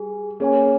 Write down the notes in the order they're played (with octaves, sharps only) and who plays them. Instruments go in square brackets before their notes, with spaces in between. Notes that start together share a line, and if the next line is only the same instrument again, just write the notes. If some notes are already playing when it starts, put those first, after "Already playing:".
Already playing: [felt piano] G3 [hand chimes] G#4 G#5
[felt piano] A#3 C#4 [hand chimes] G#4 C#5 G#5